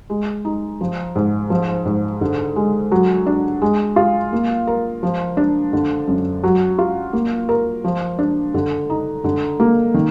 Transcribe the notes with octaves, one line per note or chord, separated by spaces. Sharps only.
G#3
D#4
F3
G#2
F3
G#2
D3
G#3
F#3
D4
G#3
F4
A#3
A#4
F3
D4
D3
F#2
F#3
F4
A#3
A#4
F3
D4
D3
D#4
D3
A#3
D#3